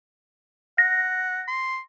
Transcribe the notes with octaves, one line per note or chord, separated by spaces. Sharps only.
F#5 A#6
C6